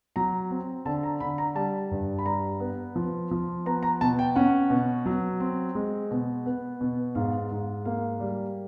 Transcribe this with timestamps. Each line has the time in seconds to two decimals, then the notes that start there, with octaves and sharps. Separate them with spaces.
0.16 F#3 A#5
0.51 C4
0.85 D3 A5
1.03 A#5
1.20 D3 B5
1.38 A#5
1.55 G3 A5
1.91 G2
2.18 B5
2.26 G3 A#5
2.60 B3
2.96 F3
3.31 F3
3.66 B3 A#5
3.83 A#5
4.01 B2 A5
4.19 G5
4.36 C#4 F#5
4.70 B2
5.06 F#3
5.40 C4
5.75 G#3
6.11 B2
6.46 B3
6.81 B2
7.15 G#2 F5
7.51 G#2
7.85 A#3 F5
8.20 G3